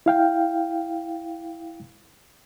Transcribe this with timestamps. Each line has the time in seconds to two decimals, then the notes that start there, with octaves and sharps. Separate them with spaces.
0.06 E4 F5 G5